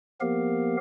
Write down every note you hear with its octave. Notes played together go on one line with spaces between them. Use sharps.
F3 A#3 B3 G4 A#4 F5